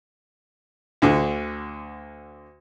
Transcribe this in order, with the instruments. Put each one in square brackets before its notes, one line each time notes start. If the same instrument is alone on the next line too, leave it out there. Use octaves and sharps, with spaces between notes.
[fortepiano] D2 D3